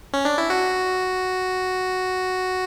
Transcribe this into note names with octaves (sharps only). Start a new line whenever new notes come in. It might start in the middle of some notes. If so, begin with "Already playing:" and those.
C#4
D4
E4
F#4